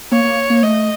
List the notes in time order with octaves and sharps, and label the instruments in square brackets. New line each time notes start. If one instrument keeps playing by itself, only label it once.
[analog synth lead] A#3 [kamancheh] C#5
[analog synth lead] A#3
A#3
[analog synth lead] A3 [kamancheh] D#5